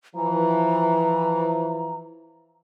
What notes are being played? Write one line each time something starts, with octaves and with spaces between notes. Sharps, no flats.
E3 F3 A#5